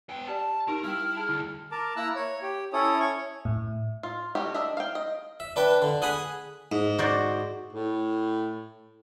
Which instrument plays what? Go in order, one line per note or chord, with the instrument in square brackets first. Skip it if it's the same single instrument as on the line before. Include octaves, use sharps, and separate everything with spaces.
[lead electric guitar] B3 G5
[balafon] G4 D5 [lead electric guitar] A5
[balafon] D#4 G4 [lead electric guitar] A#4
[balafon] G3 G5 [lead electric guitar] E4 [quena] F6
[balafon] G#4 A5
[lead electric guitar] D2 [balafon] E4
[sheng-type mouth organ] A#4 A5 D6
A#3 E4 A#5 E6 F#6
C#5
G4
C#4 E4 A4 C#5 D#6
C#5 C#6
[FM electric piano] A2
[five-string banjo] F4
G3 A3 A#3 F#4 G4
D4 D#5 E5
F5 G5
D#5
[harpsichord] E5
D4 B4 G5
D3
G#4 F#5 G#5 B5 D#6
G#2
[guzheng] F#4 C5 D5
[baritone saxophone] A2